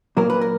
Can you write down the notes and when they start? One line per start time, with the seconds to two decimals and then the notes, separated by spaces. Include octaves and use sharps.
0.17 A#2 F#3 A#3 A#4
0.30 B4
0.41 A#4